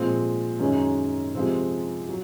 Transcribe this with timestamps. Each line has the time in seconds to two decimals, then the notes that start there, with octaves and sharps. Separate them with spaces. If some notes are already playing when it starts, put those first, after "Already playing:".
Already playing: A#2 F3 G#3 C4
0.59 F#2 D#3 G#3 C#4
1.35 C3 F3 G#3 C4
2.09 F#3